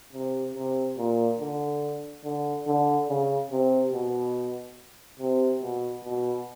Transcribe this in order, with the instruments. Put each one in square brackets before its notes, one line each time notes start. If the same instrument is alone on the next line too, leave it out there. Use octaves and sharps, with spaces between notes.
[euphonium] C3
C3
A#2
D3
D3
D3
C#3
C3
B2
C3
B2
B2